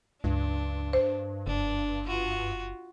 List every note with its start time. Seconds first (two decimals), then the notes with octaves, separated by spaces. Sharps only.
0.24 C#2 G2 D4
0.93 C5
1.47 F#1 D4
2.07 F4 F#4